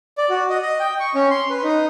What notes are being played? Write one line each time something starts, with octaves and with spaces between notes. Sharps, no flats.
D5
F#4
D#5
D#5
G5
C#6
C#4
C6
B4
D#4